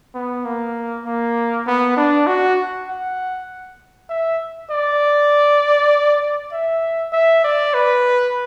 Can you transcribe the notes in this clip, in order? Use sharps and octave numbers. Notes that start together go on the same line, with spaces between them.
B3
A#3
A#3
B3
D4
F#4
F#5
E5
D5
E5
E5
D5
B4